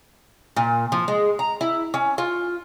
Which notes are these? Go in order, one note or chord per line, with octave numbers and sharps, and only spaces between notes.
A#2
F3
G#3
A#5
E4
C#4
F4